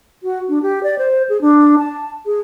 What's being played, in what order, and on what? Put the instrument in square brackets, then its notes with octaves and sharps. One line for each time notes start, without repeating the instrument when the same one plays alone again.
[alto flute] F#4
D4
G4
D5
C5
G#4
D4
A5
G#4